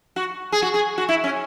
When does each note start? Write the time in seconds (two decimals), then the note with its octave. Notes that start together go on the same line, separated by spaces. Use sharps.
0.16 F#4
0.52 G#4
0.62 F#4
0.74 G#4
0.98 F#4
1.09 E4
1.24 C#4